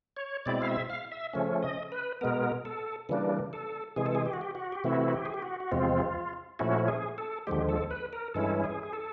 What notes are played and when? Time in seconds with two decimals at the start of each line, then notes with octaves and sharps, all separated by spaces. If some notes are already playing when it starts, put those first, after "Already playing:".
0.17 C#5
0.46 B2 G#3 C4 E4 D5
0.62 F5
0.67 E5
0.90 F5
1.12 E5
1.33 C#3 F3 A3 C#4
1.63 D#5
1.92 B4
2.21 B2 G#3 B3 A#4
2.65 A4
3.09 C#3 E3 G3 A#3 D4
3.53 A4
3.96 C3 E3 G#3 G#4
4.06 A4
4.15 G#4
4.26 G4
4.33 F#4
4.41 G4
4.55 F#4
4.72 G4
4.84 C3 E3 A3 C4 E4 F#4
5.08 F#4
5.13 G4
5.26 G#4
5.34 G4
5.42 F#4
5.60 F#4
5.71 E2 C3 F3 G#3 C4 F4
6.59 A#2 F3 A3 C#4 E4 F#4
6.88 G#4
7.18 A4
7.47 D#2 D3 F3 G#3 G4
7.69 A4
7.91 B4
8.13 A#4
8.34 G2 E3 G#3 C#4 E4 A4
8.64 G#4
8.83 G#4
8.93 A4